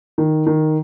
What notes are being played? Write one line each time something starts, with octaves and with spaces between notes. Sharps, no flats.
D#3
D#3